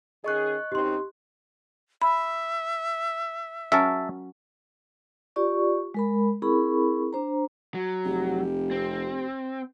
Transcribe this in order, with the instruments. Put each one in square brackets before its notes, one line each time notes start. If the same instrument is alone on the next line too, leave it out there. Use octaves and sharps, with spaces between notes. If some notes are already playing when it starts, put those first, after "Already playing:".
[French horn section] D#3 C#4 G#4 [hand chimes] D#5 C#6 F#6
[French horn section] F#2 C4 D#4 [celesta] G4 C6
[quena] E5 [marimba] B5
[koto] F#3 C#4 A#4 [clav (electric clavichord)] E5 A5
[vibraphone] F4 G4 D5 C#6
G#3 A#4 B5
C4 E4 G#4 A#4 B5 C#6
D4 C5 A#5
[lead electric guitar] F#3
[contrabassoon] F1 [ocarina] G4
[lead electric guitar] C4